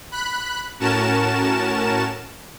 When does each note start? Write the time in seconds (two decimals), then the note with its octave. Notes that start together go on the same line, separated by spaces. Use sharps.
0.11 B5 F#6
0.80 A2 C#4 F#4 A#4 A5 E7